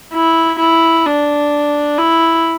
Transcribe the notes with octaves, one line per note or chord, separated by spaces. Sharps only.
E4
E4
D4
E4